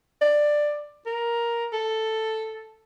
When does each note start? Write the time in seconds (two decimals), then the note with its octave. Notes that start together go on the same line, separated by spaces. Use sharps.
0.22 D5
1.06 A#4
1.73 A4